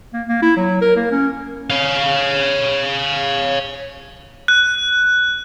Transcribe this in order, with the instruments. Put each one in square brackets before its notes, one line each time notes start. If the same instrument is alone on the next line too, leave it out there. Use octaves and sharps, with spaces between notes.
[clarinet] A#3
A#3
E4
F#3
A#4
A#3
C#4
[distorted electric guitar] C#5 F5
[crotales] F#6